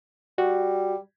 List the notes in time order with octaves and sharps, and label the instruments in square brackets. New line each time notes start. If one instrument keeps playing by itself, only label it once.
[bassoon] G3 [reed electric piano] F#4